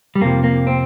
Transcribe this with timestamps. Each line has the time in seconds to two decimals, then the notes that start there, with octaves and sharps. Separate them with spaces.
0.16 G3
0.21 F2 C3 F3 A#3
0.44 A#3
0.67 C4